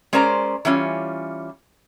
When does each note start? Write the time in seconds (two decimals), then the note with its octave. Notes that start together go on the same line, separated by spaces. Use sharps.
0.13 G#3 C#4 A#4 C5 D5 A#5
0.65 E3 G3 C#4 F4